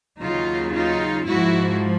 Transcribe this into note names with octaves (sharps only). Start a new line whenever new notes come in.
D#2 C#3 F#3 D#4 F4
D#4 F4
G#2 F3 E4 F#4